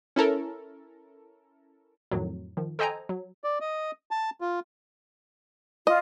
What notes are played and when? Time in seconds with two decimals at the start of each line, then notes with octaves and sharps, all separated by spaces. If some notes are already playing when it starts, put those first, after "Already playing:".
0.16 C#4 E4 A4 A#4
2.11 F2 A2 D#3 F3 F#3
2.57 D#3 F3
2.79 A4 C5 D#5 G5 G#5 A#5
3.09 F#3
3.44 D5
3.61 D#5
4.11 A5
4.41 F4
5.87 F4 D#5